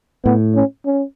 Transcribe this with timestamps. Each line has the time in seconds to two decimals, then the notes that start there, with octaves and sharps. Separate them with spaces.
0.25 A2 B3
0.55 C#4
0.85 C#4